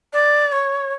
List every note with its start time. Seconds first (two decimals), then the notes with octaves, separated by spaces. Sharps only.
0.13 D5
0.52 C#5